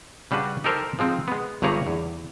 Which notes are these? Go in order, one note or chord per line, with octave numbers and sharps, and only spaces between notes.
C#3 G3 D4 F#4 B4
D#4 G4 A4 A#4 C5
F3 G#3 C4 D#4
G#3 B3
G1 G2 G4 G#4 C#5 A#5
E2